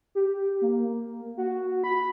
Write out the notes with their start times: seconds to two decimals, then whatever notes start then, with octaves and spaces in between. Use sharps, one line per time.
0.15 G4
0.61 A#3
1.37 F#4
1.84 B5